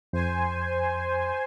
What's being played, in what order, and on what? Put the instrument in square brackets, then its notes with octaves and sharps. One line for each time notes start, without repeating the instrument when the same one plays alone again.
[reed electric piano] F2 [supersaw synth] C5 G#5